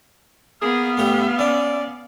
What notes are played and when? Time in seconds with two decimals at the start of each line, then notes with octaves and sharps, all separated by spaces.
0.62 A#3 B3 G#4 F5
0.97 G2 A3 G4
1.39 C#4 D5